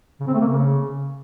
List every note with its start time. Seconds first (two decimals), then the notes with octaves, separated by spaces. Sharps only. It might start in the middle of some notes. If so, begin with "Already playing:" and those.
0.20 C#3
0.27 C4
0.34 A3
0.41 A#3
0.48 C#3